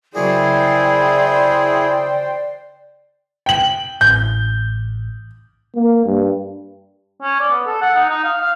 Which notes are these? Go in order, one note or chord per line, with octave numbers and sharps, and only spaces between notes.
C#3 F#3 A#3 E4 G#4 C5 D5 G5
G5 F#7
A1 G6
A#3
G2
C#4
D5
B3
A4
F#5
D#4
D#4
F5
F5